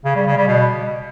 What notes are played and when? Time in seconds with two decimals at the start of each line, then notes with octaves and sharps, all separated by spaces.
0.05 C#3
0.15 G3
0.26 C#3
0.37 G3
0.48 B2